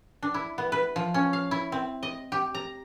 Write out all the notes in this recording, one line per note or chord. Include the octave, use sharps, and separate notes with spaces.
D4
E4
B3
B4
F3
C#4
F5
E4
C4
D#5
G4
A#5